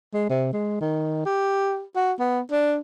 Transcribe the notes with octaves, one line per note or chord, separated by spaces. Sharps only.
G#3
C3
G#3
D#3
G4
F#4
B3
D4